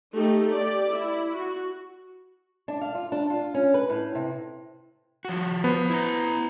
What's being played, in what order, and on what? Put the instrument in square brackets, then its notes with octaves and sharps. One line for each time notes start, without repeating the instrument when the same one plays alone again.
[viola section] A3 D#4 G4
G4 D5
E4
F#4
[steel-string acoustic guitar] D4
F5
F4
D4
F4
C#4
B4
A2
C3
[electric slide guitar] F3 F#4
[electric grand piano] B3 C5
[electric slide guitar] E4 A#5